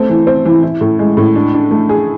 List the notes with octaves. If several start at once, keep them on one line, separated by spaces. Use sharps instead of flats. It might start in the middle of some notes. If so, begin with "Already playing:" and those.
Already playing: A3 C4
E3
C4
E3
E4
A2
G#3
A2
D4
D4
A3
G#4